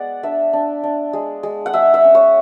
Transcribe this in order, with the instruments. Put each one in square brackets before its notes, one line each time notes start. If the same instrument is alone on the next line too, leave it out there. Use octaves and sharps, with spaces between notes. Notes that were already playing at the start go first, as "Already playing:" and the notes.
Already playing: [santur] G#3 B3 D5 F#5
D4 E5
D4
D4
G#3
G#3
F#5
G#3 E5
E5
C#4
C#5